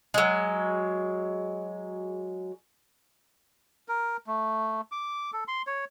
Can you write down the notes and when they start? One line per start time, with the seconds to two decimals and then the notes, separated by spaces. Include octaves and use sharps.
0.14 F#3 G#3
3.88 A#4
4.27 A3
4.92 D6
5.33 A4
5.48 C6
5.67 C#5